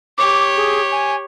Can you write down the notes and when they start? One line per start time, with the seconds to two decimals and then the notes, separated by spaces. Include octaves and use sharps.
0.18 G4 C#5 D6
0.57 G#4
0.92 G#5